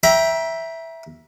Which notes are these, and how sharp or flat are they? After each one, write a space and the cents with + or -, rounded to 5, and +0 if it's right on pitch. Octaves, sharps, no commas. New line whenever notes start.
E5 +0 G5 +0 A#5 +35